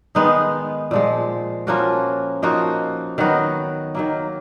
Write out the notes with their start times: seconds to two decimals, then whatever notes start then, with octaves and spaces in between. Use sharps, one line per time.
0.15 D#3 G#3 B3 D#4
0.91 A#2 F3 G#3
1.67 F3 A#3 C#4 F#4
2.43 F3 A#3 D#4 F#4
3.18 D#3 F#3 B3 F#4
3.95 D#3 F#3 A#3